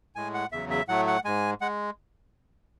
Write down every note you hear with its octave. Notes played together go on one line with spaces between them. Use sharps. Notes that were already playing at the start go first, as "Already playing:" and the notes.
A2 G#3 G#5
F#5
E2 C#3 F#3 E5
E5
A2 F#3 A3 F#5
F#5
G#2 G#3 G#5
G#3 F#5